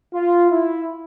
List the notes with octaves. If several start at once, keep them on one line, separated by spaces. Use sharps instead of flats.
F4
E4